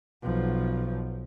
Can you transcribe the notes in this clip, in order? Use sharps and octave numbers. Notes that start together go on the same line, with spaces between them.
B1 F3